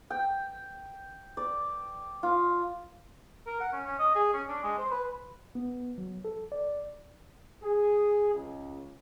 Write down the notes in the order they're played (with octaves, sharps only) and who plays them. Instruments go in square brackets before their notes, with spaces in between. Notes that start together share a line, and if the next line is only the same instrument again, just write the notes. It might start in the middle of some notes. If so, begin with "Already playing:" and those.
[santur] G5
D5
F4
[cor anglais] A#4
F#5
C#4
C#4
D#5
G#4
C#4
D4
G#3
C5
B4
[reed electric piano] B3
F#3
A4
D5
[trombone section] G#4
C#2